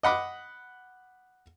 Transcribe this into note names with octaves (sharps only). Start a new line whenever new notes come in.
D#5 F#5 B5 D6